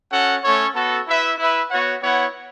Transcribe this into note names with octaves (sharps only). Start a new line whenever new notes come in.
C#4 F#4 A4 F#5
A3 C#4 A4 C#5
B3 F#4 A4
E4 B4 E5
E4 B4 E5
B3 F#4 C#5 F#5
B3 E4 C#5 F#5